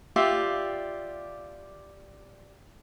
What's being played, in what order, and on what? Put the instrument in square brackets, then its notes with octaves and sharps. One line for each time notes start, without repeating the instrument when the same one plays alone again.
[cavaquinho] F4 G4 D5 E5